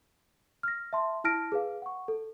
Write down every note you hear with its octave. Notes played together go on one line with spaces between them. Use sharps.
F6 A#6
E5 A5 C6
E4 A5 F6 A#6 D7
G#4 B4 F5
F#5 C#6
A4